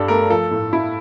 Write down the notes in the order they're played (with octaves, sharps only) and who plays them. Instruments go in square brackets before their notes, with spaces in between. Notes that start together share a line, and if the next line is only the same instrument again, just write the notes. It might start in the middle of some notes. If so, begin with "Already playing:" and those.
Already playing: [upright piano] G2 D4 [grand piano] G4 A4
[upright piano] A3 [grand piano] A#4
[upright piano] F3 [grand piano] A4
[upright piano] A2
E4